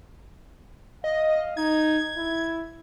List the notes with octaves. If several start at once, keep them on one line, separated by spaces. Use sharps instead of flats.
D#5 F5
D#4 G#6
E4